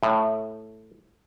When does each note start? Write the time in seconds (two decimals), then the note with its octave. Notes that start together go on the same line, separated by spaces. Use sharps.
0.03 A2